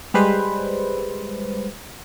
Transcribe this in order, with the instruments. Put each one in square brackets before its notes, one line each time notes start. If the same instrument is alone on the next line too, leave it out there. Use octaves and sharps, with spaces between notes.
[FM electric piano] G3 G#3 B4 C5